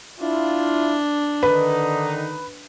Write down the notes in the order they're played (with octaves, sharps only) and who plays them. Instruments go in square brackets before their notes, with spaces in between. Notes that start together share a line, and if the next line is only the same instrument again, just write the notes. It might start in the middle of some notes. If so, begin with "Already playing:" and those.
[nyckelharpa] D4 [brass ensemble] E4 F4
[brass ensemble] D3 D#3 D#4 [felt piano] B4